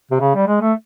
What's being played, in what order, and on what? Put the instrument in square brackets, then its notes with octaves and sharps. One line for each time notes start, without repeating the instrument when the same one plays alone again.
[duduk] C3
C#3
G3
G#3
A3